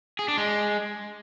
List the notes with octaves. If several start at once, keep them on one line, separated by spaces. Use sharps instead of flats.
G#4
D4
G#3